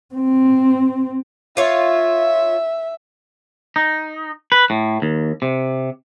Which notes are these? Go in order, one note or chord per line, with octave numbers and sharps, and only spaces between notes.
C4
F4 C#5 E5
D#4
B4
A2
D#2
C3